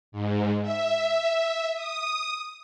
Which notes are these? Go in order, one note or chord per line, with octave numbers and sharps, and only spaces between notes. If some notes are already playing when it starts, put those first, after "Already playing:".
G#2
E5
D#6